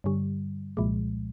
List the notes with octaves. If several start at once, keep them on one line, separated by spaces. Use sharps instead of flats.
G2 D3 G3
C2 A#2 F3 G#3